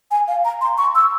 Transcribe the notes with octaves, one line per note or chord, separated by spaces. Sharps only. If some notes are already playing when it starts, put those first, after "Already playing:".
G#5
F5
A#5
C6
C#6
E6